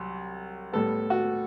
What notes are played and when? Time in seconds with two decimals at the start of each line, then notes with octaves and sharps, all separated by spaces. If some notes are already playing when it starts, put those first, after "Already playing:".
Already playing: C2 F#3
0.73 A2 G3 B3 A4
1.10 F#4